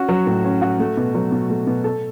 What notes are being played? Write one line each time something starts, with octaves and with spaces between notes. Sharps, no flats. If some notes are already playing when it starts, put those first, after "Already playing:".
Already playing: C#4 F#4
F#3
A2
C#4
F#4
A3
B2
F#3
B2
A3
B2
A4